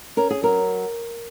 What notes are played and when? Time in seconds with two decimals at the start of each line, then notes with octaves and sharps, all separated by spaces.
0.17 C#4 A#4
0.30 G#4
0.43 F#3 A#4